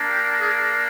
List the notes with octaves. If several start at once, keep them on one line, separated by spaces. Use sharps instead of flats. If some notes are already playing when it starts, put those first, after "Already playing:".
Already playing: A#3 D4
G4
G#4